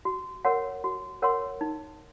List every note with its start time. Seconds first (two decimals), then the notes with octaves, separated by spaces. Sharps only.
0.05 F#4
0.45 A#4 C#5 F#5 C6
0.84 F#4
1.22 A#4 C#5 F#5 C6
1.61 D#4